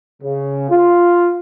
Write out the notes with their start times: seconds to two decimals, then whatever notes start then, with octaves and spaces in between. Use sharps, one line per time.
0.23 C#3
0.71 F4